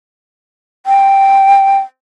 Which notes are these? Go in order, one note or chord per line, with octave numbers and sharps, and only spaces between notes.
G5